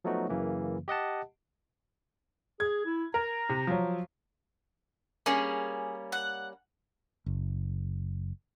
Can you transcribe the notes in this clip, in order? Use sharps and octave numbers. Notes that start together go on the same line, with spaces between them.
F3 F#3 A3 B3 D#4 F#4
F#2 C#3 E3 A#3
G4 D#5 F#5 A5
G#4 G#6
E4
A#4 A#5
C3
F3 F#3
G3 A#3 C#4 G#4
F#5
F#1